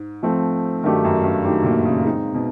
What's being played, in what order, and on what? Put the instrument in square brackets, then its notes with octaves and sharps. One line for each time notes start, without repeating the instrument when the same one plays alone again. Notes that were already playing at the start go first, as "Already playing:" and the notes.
Already playing: [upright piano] G#2
[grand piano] F3 A3 C4
[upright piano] G2 [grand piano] D#3 F#3 A3 D4 G4
[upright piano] F#2
G2
[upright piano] G#2 [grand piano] D#3 F#3 A3 D4 G4
[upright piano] A#2
C#3
[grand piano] G#3 C4 D#4 G#4
[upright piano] B2